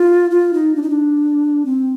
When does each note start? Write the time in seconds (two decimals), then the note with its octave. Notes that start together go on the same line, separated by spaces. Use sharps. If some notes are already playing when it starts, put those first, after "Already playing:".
Already playing: F4
0.31 F4
0.53 D#4
0.76 D4
0.82 D#4
0.90 D4
1.65 C4